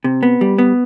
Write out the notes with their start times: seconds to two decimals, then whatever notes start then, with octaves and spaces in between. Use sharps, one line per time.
0.04 C3
0.23 B3
0.41 G3
0.58 B3